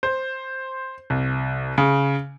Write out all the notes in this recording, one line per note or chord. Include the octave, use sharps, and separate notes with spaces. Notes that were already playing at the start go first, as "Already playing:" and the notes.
C5
C2
C#3